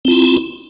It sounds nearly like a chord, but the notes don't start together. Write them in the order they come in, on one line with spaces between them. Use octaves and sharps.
C4 F4 E4